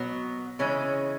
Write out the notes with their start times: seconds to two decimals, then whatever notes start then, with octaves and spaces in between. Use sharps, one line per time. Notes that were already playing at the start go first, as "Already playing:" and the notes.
Already playing: B2 F#3 B3
0.59 C#3 E3 G#3 C#4